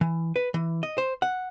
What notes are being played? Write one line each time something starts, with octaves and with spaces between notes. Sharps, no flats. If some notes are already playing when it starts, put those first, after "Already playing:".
E3
B4
E3
D#5
C5
F#5